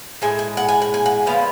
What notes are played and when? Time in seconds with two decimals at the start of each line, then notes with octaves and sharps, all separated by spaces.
0.22 A2 G#3 G#5
0.39 G#5
0.57 F#5
0.69 G#5
0.82 F#5
0.94 G#5
1.06 F#5
1.26 D3 F3 B3 F5